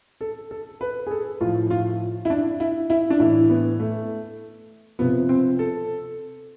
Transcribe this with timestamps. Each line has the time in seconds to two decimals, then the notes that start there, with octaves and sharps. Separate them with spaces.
0.21 A4
0.51 A4
0.81 B4
1.07 G#4
1.11 A4
1.41 A2 F3 F4
1.70 F4
2.25 E4
2.30 D4
2.60 E4
2.90 E4
3.10 D4
3.20 A2 E3 E4
3.50 B3
3.79 A3
4.99 C3 F3 B3
5.29 C4
5.59 A4